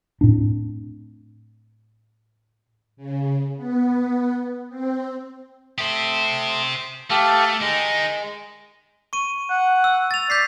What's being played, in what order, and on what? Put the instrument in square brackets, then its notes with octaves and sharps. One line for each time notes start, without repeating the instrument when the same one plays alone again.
[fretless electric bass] A2 C4 D4
[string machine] C#3
B3
C4
[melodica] A3 D#6 [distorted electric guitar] G4 C5
[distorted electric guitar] A3 [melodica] G4 A4 F5
[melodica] G#3 [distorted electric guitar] D#4 A#4
[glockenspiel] C#6 D#7
[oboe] F#5
[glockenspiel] E6
A6 F7
[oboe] D5 [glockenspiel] G6 B6 C7